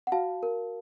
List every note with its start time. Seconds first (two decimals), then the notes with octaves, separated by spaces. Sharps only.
0.07 F#5
0.12 F#4 F5 A5
0.43 A#4